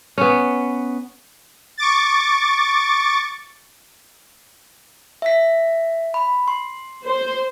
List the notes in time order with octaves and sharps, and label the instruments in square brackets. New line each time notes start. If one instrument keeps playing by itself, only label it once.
[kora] B3 C#4
[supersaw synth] C#6 D6 A6
[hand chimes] E5 B6
B5
C6
[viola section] C5